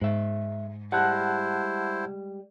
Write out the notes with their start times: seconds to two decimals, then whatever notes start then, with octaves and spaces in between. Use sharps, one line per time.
0.01 G#2 G#3 E5
0.92 G3 G#3 E4 C5 F#5 A5 F#6